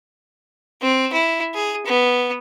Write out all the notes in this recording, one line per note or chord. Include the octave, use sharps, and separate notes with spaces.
C4
E4
G#4
B3